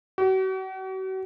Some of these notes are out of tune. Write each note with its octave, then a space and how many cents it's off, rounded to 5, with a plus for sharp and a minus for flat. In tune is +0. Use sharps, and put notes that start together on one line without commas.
F#4 +40